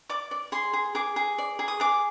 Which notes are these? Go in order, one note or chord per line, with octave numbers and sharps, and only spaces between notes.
D5 D6
D5
G#4 C6
G#4
G#4 D6
G#4
D5
G#4
D#6
G#4 D6